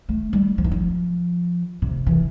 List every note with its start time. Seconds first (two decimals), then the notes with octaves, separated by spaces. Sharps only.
0.09 A3
0.33 G3
0.58 F3
0.64 E3
0.71 F3
1.82 C3
2.07 E3